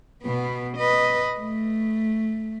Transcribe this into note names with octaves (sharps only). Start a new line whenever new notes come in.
B2 B3
B4 D#5
A3